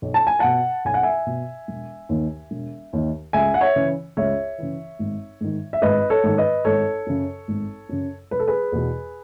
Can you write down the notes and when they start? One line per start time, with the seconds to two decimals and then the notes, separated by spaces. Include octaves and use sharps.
0.02 B1
0.14 A5
0.27 G#5
0.39 B2 F#5 A5
0.85 B1 G#5
0.94 F#5
1.03 E5 G#5
1.26 B2
1.68 E1
2.09 D#2 D#3
2.51 E1
2.93 D#2 D#3
3.33 C#2 E5 G#5
3.54 F#5
3.61 C#5 E5
3.76 C#3 E3
4.17 C#2 C#5 E5
4.58 C#3 E3
4.99 G#1
5.41 G#2 D#3
5.73 E5
5.82 G#1 B4 D#5
6.10 A4 C#5
6.24 G#2 D#3
6.38 B4 D#5
6.65 G#1 A4 C#5
7.07 F#2 C#3
7.48 G#1
7.89 F#2 C#3
8.31 E1 B4
8.39 A4
8.47 G#4 B4
8.72 E2 B2